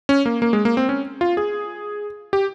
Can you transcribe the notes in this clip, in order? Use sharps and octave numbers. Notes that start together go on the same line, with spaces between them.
C#4
A#3
A#3
G#3
A#3
C4
C#4
F4
G#4
G4